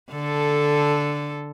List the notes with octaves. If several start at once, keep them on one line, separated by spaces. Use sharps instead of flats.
D3 A4